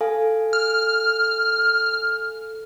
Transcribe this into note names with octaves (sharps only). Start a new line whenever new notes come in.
A4 F5 G#5
F6